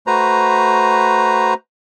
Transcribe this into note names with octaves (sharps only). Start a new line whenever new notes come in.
A3 F#4 B4 C5 A#5